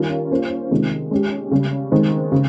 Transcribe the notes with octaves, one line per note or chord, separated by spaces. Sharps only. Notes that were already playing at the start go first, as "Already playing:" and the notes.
Already playing: D#3 G3 C#4 F4 A#4
A#3 C#4 F4 C5
C3 D#3 G#3
G#3 C#4 G4
C#3 G3 C#4
D#3 G#3 C4
C#3